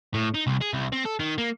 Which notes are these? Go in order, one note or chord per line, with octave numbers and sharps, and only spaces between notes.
A2
D#4
C2
G#4
C2
C4
A4
D#3
A#3